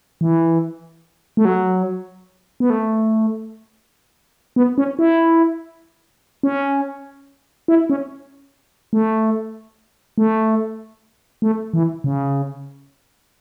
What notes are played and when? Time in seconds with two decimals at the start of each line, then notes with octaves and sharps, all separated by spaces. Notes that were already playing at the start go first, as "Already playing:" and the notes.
0.21 E3
1.37 A3
1.45 F#3
2.60 B3
2.70 A3
4.56 B3
4.78 C#4
4.99 E4
6.43 C#4
7.68 E4
7.90 C#4
8.93 A3
10.18 A3
11.42 A3
11.74 E3
12.04 C#3